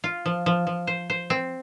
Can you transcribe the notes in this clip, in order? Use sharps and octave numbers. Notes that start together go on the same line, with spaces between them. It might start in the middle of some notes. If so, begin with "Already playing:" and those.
F4
F3
F3
F3
C5
C5
C4